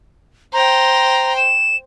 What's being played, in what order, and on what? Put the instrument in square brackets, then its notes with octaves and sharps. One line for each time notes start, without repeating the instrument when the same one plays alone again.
[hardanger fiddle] C5 G5 [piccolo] A#5
[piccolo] E7